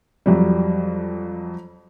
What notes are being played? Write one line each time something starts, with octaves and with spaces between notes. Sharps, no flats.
F2 F#3 G3